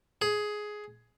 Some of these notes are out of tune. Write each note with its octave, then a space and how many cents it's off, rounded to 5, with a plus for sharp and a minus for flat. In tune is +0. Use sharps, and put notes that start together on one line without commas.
G#4 +10